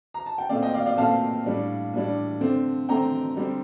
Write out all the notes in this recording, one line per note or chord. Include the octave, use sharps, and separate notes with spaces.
A#5
A5
G5
A#2 A3 C4 D5 F5
D#5 G5
D5 F5
D5 F5
A#2 A3 C4 F5 A5
A2 G3 D4
A2 G3 D4
D3 A3 C4
D3 A3 C4 G5 A#5
D3 G3 C4